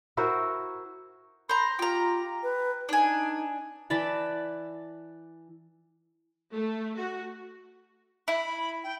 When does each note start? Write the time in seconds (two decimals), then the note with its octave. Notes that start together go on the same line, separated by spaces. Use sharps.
0.17 E4 F#4 A#4 C5
1.49 C5 A#5 B5
1.79 F4 G4 A#5
2.43 B4
2.89 D4 D#4 G#5
3.90 E3 D5 A5 B5
6.55 A3
6.97 F#4
8.28 E4 B5
8.84 G5